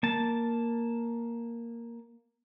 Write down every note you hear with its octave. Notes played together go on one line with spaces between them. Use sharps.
A#3 A5